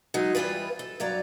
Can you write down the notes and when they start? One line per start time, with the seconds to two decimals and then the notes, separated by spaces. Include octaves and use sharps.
0.14 F#3 G#3 D#4
0.35 E2 E3 G3 F4 B4
0.79 A4
1.00 G2 F#3 D5 A#5